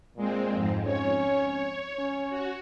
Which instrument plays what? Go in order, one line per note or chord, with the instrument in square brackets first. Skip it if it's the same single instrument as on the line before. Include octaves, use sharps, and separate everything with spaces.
[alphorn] A#2 [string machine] G#3 C4
[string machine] F2 G#2
[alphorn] C#4 [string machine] C#5
[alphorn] C#4
[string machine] F#4